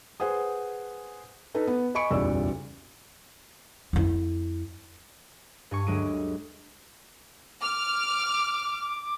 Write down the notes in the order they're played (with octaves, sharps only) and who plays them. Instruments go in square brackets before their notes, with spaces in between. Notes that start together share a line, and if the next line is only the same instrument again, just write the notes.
[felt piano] G#4 B4 C5 F#5 G#5 D#6
D#4 A4 B4
B3
D#5 G#5 B5 C#6 C#7 D7
F#1 B1 E2 G3 D5 E6
[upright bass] F2 E4
[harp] G2 G#5 C#6
D2 F#3 G#3 D7 D#7
[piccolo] D6 [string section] F6